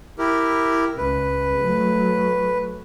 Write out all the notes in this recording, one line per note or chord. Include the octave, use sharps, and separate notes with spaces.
E4 G4 A#4
C#2 B4
F#3 A3